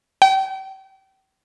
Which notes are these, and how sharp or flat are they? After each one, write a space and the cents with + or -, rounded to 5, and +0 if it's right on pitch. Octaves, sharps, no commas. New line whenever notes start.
G5 -35